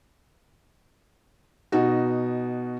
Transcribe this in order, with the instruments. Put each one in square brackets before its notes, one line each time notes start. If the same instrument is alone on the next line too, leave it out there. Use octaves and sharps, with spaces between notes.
[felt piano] B2 D#4 F#4